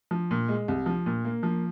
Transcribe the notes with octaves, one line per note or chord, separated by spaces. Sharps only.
F3
A#2
G#3
C2
F3
A#2
A#3
F3